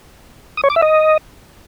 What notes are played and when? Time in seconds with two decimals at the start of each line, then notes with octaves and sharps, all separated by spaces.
0.57 D#6
0.64 C#5
0.70 D6
0.76 E5
0.82 D#5